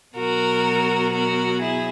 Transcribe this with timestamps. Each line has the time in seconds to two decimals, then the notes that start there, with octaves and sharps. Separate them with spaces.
0.16 B2 F#3 F#4 A#4
1.12 F#4 A#4
1.60 E4 G#4